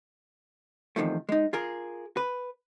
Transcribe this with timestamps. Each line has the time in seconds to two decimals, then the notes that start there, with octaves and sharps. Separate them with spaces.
0.96 E2 C3 D#3 F3 A3
1.29 G#3 D#4
1.53 F4 G#4 A#4
2.17 B4